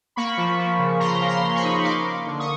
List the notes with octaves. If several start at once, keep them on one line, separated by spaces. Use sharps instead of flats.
A#3 B5 C#6
F3
F3
C#3
C#3 A#5 C6
A#3
A#5 C6
C#3
B5 C#6
D#4
A#3 C6 D6
A#3
D3
C#6 D#6